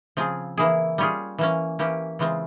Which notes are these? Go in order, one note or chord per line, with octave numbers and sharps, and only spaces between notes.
C#3 F3 C4 F4 G#4
E3 A#3 E4 G#4
G3 C#4 F4 G#4
E3 A#3 C#4
E3 A#3 C#4 G4
C#3 E3 G#3 C4 F4